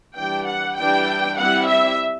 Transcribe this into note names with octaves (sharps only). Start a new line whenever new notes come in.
E3 G3 D4 G5
F#5
E3 G3 D4 G5
G3 C4 E4 F#5
E5